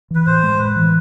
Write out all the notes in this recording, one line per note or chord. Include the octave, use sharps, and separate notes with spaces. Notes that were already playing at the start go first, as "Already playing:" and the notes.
E3 B4
A2 C5
G#3
A2 B4
E3